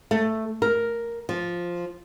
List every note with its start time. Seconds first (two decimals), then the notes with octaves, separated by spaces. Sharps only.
0.11 A3
0.62 A#4
1.29 F3